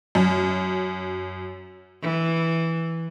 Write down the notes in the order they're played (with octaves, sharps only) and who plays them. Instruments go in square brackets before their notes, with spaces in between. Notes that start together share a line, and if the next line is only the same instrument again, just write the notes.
[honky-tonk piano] F#2
[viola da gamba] E3